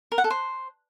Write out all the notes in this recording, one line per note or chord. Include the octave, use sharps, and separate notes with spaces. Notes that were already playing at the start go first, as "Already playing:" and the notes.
A#4
F#5
A4
C5